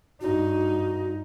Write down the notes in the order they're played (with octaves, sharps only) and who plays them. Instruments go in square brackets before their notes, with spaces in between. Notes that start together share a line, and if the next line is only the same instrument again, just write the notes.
[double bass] G2 D#4 [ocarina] F#4